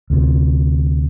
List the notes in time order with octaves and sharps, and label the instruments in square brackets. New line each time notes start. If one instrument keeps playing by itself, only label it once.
[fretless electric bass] D2 C3